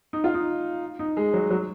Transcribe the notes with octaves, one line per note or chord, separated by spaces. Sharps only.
D#4
F4
D#4
D#4
G#3
F#3
F#3